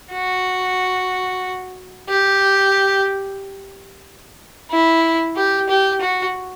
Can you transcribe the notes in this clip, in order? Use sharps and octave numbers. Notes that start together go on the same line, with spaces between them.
F#4
G4
E4
G4
G4
F#4